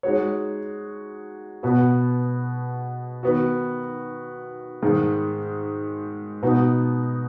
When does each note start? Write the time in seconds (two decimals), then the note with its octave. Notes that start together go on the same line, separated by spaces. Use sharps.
0.03 G#3 D#4 F#4 C#5
1.63 B2 B3 F#4 B4
3.23 D#3 B3 F#4
4.82 G#2 D#3 G#3
6.42 B2 B3 D#4 F#4